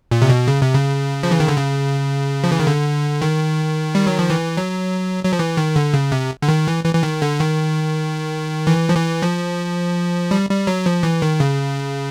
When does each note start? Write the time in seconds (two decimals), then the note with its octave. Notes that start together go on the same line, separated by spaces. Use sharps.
0.11 A#2
0.22 C3
0.29 B2
0.48 C#3
0.62 C3
0.75 C#3
1.23 F3
1.31 E3
1.40 D#3
1.48 D3
1.57 C#3
2.44 F3
2.52 E3
2.59 D#3
2.67 D3
3.22 D#3
3.95 G3
4.07 F#3
4.19 F3
4.30 E3
4.57 F#3
5.25 F#3
5.33 F3
5.39 E3
5.57 D#3
5.76 D3
5.94 C#3
6.12 C3
6.42 D3
6.49 D#3
6.67 E3
6.85 E3
6.95 E3
7.03 D#3
7.22 D3
7.40 D#3
8.67 E3
8.89 F3
8.95 E3
9.22 F3
10.31 G3
10.50 G3
10.67 F#3
10.86 F3
11.03 E3
11.22 D#3
11.40 C#3